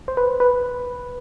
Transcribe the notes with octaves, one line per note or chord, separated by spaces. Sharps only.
C5
B4
B4